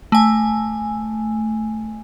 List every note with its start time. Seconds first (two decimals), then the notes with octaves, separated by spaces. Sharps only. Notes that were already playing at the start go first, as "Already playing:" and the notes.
0.12 A3 G#5